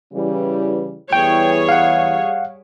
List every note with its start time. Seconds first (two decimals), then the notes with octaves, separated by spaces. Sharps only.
0.13 C#3 E3 G3
1.13 E2 E3 G3 G#4 C#5 G5
1.69 F5 F#5